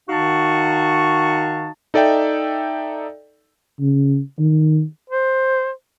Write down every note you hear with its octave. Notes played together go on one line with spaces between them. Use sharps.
D#3 D#4 F#4 F5 A5 C#6
D#4 A4 D5 E5 G5
C#3
D#3
C5